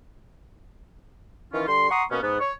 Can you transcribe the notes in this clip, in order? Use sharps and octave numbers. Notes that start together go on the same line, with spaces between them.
D#3 E3 C#4 F4
D3 G3 C6
F#5 A#5 C6 C#6 D#6
B2 A#3 B3 C#4
G#2 B3
C#5